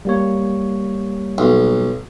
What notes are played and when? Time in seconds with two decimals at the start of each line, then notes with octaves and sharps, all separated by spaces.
0.05 G3 A#3 C#5
1.38 B1